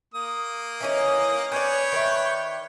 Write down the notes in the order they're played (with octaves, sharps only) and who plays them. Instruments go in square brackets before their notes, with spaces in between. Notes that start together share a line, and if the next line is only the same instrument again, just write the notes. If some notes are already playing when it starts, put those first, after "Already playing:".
[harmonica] A#3 D#6
[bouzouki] E3 C#4 D#4
[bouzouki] C#4 D5 [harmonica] B4 C#5 G5
[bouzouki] D#3 D5 E5